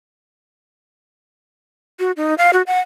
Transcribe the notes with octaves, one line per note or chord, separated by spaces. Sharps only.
F#4
D#4
F5
F#4
F#5